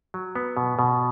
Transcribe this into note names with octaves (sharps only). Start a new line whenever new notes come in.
F#3
B3
B2
B2